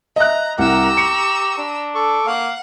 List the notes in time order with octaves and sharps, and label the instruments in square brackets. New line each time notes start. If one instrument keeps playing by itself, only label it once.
[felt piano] D#5 E5 F#6 [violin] A#5
[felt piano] C2 [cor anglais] G4 [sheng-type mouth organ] A#4 F#5 [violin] A#5 E6
[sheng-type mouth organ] C#6 [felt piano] C#7
[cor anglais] D4
[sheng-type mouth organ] A4 C#6 D6
[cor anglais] A#3 [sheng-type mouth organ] F5 [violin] F#5